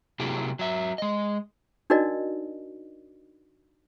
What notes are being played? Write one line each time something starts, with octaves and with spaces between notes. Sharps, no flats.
C3 F#3 A#3 E4 G4 G#4
F#3 E5
G#3 D#5
D4 D#4 F#4 A#4 D5 D#5